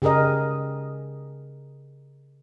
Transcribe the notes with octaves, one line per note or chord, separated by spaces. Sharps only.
C#3 G4 G#4 A#4 D#5